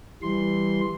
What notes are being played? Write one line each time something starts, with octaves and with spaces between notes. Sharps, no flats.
E3 G3 C6